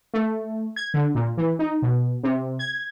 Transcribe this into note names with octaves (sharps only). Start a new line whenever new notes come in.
A3
G#6
D3
A#2
E3
D#4
B2
C3
G#6